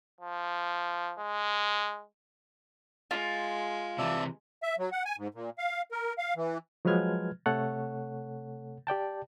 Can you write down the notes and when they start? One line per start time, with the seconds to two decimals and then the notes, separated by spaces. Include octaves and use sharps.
0.20 F3
1.19 G#3
3.11 G#3 F4
3.98 C3 E3 D5 E5 A5
4.63 E5
4.79 F#3
4.92 F#5
5.05 G#5
5.18 G#2
5.34 A#2
5.58 F5
5.91 A#4
6.18 F5
6.36 E3
6.85 F3 F#3 G#3 B4 F6 G#6
7.46 C3 A3 A4 C#5 F#5
8.87 G4 D5 G5 A5